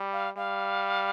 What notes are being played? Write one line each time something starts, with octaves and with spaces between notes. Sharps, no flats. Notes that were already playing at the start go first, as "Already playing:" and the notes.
Already playing: G3
F5
G3 F5